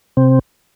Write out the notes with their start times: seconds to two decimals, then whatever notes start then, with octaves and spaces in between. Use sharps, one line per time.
0.17 C3 C4